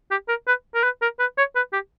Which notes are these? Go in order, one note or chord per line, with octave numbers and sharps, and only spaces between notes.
G4
A#4
B4
A#4
B4
A#4
B4
C#5
B4
G4